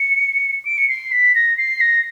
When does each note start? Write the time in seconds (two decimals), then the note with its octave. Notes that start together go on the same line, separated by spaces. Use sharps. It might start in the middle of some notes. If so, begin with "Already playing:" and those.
Already playing: C#7
0.65 D7
0.78 C#7
0.89 C7
1.12 B6
1.35 A#6
1.58 C7
1.81 A#6